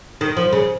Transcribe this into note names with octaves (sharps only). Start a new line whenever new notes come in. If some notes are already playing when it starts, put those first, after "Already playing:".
D#3
F3
C#3